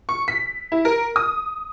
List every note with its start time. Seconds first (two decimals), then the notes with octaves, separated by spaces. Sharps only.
0.09 C#6
0.28 B6
0.72 E4
0.85 A#4
1.16 D#6